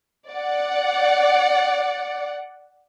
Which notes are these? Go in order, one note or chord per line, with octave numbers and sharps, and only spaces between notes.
D5 F#5